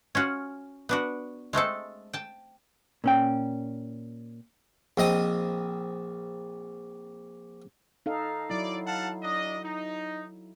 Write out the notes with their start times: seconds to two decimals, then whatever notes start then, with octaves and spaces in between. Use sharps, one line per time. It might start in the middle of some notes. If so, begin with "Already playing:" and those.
0.15 C#4 F4 F#4
0.89 B3 D4 F#4
1.53 G#3 A3 C4 A4
2.13 G5 A5
3.04 A#2 C#4 G5
4.98 A#1 C4 D#5 D#6
8.06 D#4 A4 F5
8.50 F#3 E4 D5
8.86 F5 F#5 A5
9.22 D4 D#5
9.63 D#4